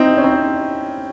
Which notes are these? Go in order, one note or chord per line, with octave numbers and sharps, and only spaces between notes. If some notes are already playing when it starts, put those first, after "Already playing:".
Already playing: C4 D#4 E4
C#4
C4 D#4